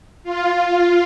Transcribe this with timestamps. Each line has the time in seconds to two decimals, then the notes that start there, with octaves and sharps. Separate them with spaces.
0.24 F4